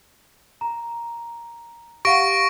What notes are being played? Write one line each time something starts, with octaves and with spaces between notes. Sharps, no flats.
A#5
G4 F5 F#5 C#6 A#6 D7